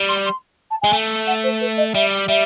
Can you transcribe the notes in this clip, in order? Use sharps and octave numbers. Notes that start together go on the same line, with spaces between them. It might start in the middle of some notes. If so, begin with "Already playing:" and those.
Already playing: G3
C6
C6
A5
G#3 G#5
A3
F#5
C5
B4
D#5
G3 E5
G3 E5